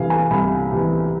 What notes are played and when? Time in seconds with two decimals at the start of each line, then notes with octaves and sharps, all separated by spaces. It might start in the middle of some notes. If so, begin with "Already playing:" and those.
Already playing: C2 C3 E3 F5 G#5
0.10 G#5
0.30 C2 B5
0.72 C3 E3